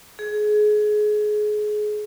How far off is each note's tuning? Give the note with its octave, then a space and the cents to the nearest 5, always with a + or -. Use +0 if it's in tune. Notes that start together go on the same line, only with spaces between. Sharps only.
G#4 +25